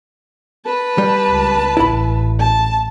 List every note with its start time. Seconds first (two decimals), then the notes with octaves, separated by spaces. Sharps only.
0.65 B4 A5
0.98 G3
1.28 C#2
1.77 A1 E4 B5
2.39 A5